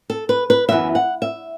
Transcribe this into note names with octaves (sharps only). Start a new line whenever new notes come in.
A4
B4
B4
F#2 E3 B3 E5
F#5
E5